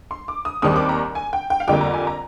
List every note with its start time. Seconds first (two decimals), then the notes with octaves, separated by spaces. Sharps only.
0.11 C6
0.28 D6
0.45 D#6
0.62 D#2 D#3 G3 C4 D#6
0.76 D6
0.89 A#5
1.15 G#5
1.33 G5
1.50 G5
1.60 F5
1.68 F2 D3 G3 A#3 G5
1.81 A#5
1.94 G#5
2.07 A#5